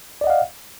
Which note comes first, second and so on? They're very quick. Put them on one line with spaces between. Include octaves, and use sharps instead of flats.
D5 D#5 F#5 F5